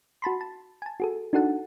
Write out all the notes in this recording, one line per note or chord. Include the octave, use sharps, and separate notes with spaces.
F#4 A5 B5 C6
A5
G#5 A5
F#4 G#4 A4
D4 D#4 F#4 A4 F#5 A5